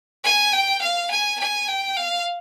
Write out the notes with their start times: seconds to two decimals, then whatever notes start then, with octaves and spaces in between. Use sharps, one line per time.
0.24 G#5
0.53 G5
0.81 F5
1.10 G#5
1.39 G#5
1.68 G5
1.96 F5